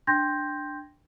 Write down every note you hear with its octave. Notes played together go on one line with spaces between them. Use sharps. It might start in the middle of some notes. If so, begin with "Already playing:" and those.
D4 G5 C6 G6 G#6 A#6